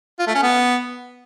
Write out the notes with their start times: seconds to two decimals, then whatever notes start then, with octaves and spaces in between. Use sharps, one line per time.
0.19 F4
0.27 A3
0.35 C#4
0.42 B3